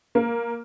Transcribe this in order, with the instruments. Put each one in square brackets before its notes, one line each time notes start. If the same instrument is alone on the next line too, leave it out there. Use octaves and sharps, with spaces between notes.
[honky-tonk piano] A#3